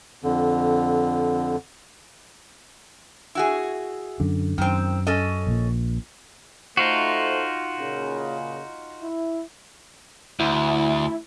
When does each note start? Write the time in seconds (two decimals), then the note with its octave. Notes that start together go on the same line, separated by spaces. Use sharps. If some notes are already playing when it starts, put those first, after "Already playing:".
0.24 F2 D3
3.35 E4 F#4 G#4
4.20 F#2 D3
4.58 F#2 D#3 C4
5.07 C#4 A4 D#5
5.47 A#1 A#2
6.77 A3 D#4 F4 F#4 C5
7.78 A#2 C#3
9.02 E4
10.40 D2 E4